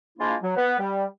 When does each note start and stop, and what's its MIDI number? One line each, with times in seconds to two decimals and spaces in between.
0.18 0.35 53
0.18 0.35 56
0.18 0.35 58
0.18 0.35 62
0.18 0.35 64
0.18 0.35 65
0.42 0.53 54
0.56 0.77 59
0.56 0.77 71
0.78 1.03 55